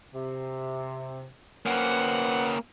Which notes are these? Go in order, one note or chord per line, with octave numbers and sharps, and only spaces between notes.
C3
A#3 C#4 B4 C5 F#5